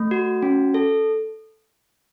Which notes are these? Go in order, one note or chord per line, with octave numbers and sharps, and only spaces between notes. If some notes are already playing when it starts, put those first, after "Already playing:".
Already playing: A3
F#4
C#4
A4